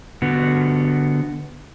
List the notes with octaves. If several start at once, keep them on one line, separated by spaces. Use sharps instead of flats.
D3 B3 F#4